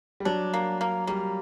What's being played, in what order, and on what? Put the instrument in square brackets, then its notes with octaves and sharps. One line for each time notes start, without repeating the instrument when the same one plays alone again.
[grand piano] G3
[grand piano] F#3 [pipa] D4
[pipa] A#3
A#3
[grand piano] G3 [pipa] A#3